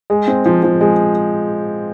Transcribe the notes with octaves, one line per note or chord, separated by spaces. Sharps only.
G#3
C4
F3
F3
G#3